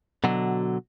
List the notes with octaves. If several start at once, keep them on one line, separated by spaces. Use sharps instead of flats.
B2 D3 F#3